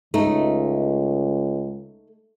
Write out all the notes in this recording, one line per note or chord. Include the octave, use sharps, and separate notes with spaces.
C#2 A3 D#4